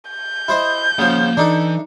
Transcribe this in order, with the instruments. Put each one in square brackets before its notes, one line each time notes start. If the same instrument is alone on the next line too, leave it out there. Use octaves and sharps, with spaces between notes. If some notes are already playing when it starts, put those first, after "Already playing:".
[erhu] G6
[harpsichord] E4 C5 D#5
[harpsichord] C#3 F3 [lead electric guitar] A#3 F#5
[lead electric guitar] E3 [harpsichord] D4 D#4 A4